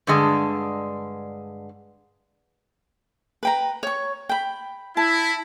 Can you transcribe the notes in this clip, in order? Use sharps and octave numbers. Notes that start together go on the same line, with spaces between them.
G2 D3 G#3
B4 G5 A#5
C#5 C#6
G5 B5
E4 A5